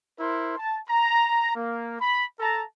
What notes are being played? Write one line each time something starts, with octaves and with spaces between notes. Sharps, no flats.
E4 A#4 C5 C6
A5
A#5
A#3
B5
A4 A5 A#5